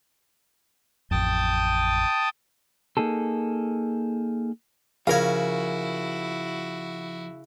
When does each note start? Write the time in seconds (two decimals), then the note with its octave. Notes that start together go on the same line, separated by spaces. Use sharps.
1.11 A1 F2 G5 A5 D#6
2.97 A#3 D#4 G#4 A4
5.07 C#3 F3 E4 F#4 A#4 F5 G#5